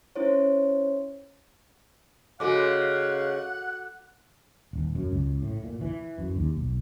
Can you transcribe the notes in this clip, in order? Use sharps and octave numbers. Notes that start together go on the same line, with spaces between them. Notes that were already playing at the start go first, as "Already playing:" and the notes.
C#4 E4 C5 C#5
C#3 G#3 F#4 A4 F5 F#5 D6
D#1
F#2
C#2
A2
A#2
E3
F#2
D#2
B1